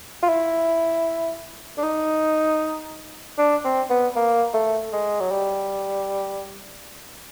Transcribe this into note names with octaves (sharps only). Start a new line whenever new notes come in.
F4
E4
D4
D#4
D4
C4
B3
A#3
A3
G#3
F#3
G3